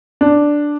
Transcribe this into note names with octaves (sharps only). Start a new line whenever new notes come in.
D4